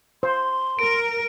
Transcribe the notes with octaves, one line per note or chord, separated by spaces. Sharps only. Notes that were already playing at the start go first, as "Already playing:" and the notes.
C5 C6
A#4 D7